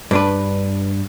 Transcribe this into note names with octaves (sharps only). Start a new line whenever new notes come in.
G2 D4 B4